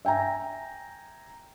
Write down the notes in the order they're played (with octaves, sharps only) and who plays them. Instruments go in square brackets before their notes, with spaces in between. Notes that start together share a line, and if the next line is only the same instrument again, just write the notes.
[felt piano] E5 G5 G#5 A#5